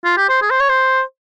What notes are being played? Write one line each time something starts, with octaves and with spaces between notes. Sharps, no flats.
F4
G4
C5
G#4
C5
C#5
C5